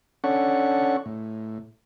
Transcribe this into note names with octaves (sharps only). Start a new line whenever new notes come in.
C#4 D4 A4 F#5 C#6
A2